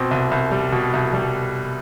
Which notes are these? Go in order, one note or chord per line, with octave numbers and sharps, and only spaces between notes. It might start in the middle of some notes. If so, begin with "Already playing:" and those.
Already playing: B2 C4
C2
C2
G3
B2
C2
G3